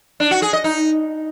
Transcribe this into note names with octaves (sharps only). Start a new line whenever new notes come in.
D4
F#4
G#4
D#5
D#4